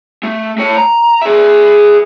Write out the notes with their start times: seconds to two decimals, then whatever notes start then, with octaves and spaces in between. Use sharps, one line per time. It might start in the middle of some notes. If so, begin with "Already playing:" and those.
0.23 A3
0.58 A3 C#5
0.77 A#5
1.22 G#4 E5